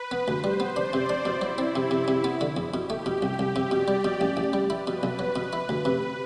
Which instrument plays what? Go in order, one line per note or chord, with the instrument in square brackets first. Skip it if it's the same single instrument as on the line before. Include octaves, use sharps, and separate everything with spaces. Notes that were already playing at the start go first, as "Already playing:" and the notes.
Already playing: [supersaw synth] B4
[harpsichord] B3
[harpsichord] D2 [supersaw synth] C5
[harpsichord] G3
B3
[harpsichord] D4 [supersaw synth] D5
[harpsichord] C3
D4
[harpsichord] B2 [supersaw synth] E4
[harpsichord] F#3
C4
[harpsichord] C3 [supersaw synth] E4
[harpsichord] C3
C3
B3
D3
E2
[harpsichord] B2 [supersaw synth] G4
[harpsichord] A3
B2
[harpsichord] C2 [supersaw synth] G4
[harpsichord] C2
C3
[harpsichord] B2 [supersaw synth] D5
[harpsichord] G3
B2
A1
A1
G3
[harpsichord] E4 [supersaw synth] B4
[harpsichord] B2
B1
F#3
B2
E4
D2
C3